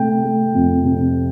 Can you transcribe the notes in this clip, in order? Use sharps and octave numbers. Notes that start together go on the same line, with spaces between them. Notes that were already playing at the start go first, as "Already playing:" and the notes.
Already playing: C3 A3 G5
A3
F2
C3